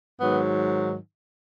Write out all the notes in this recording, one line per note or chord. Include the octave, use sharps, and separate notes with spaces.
G#2 D#3 F#3 B3